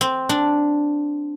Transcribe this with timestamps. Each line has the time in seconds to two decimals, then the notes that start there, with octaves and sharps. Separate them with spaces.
0.01 C4
0.29 D4